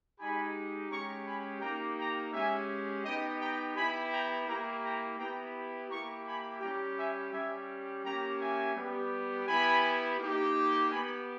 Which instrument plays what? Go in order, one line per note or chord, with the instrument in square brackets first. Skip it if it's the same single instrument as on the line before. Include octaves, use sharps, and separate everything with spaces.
[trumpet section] G#3 D#4 G4 G#5 B5
G#3 C#4 G4 A#5 C#6
G#5 B5
A#3 D#4 G4 G5 A#5
G5 A#5
G#3 C#4 G4 E5 G#5
B3 D#4 G4 D#5 G5
G5 A#5
B3 E4 G4 G#5 B5
G5 A#5
A#3 E4 G4 G5 A#5
G5 A#5
B3 E4 G4 G5 A#5
A#3 E4 G4 A#5 C#6
G#5 B5
G3 C#4 G4 G5 A#5
E5 G#5
G3 C#4 G4 E5 G#5
A#3 C#4 G4 G5 A#5
E5 G#5
G3 B3 G4
B3 E4 G4 G#5 B5
A#3 D#4 G4
B3 G4 G#5 B5